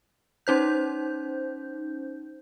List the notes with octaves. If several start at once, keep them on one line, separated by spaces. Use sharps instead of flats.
C#4 D#4 C5 G6